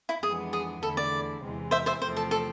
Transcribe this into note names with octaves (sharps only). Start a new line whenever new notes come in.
E4
F2 E3 G#3 B3 D4 G#4
G#4
E2 D3 A3 E4 A4
D5
E2 C3 E3 G#3 C4
C5 E5
C5 E5
E2 C3 F3 A3 C4 C5
A4
A4